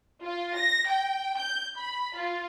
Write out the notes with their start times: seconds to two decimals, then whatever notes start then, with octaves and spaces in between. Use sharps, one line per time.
0.23 F4
0.56 A#6
0.88 G5
1.38 G6
1.77 B5
2.17 F4